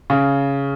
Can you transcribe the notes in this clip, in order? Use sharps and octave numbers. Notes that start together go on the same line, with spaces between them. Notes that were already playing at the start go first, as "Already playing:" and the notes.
C#3